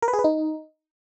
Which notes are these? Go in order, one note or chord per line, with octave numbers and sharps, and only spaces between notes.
A#4
B4
G#4
B4
D#4